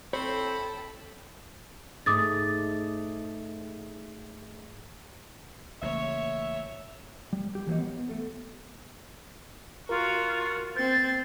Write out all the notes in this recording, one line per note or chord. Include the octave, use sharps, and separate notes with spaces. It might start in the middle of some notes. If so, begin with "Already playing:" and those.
C4 E4 A4 C#5 G5 B5
G#2 A3 D6 D#6 A6
A1 C#3 A#3 C#5 E5
G3
G4
E3 F#3 A#3 G4 C#5 D#5
B3
A3 A4
F4 F#4 A#4
C4 G6 A6